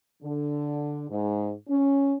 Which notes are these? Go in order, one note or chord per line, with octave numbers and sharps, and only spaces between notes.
D3
G#2
C#4